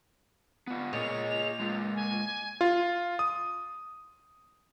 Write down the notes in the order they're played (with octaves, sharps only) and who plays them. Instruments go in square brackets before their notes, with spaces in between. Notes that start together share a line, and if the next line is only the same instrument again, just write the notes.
[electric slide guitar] B3 F4
[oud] A#2 [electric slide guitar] G#4 C#5 D#5 [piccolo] F7
[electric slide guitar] G#3 F4
[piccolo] G#5
[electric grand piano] F4
D#6